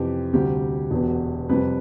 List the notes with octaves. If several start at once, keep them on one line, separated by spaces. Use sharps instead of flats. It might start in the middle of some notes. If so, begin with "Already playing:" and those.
Already playing: F2 C3 E3 G4
D2 C3 G3 G4
E1 E2 B2
F2 C3 G3 B4